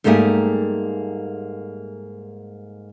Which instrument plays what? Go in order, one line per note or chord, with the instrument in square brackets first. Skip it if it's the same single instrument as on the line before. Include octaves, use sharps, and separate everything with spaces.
[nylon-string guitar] G#2 G3 A3 A#3 G4 G#4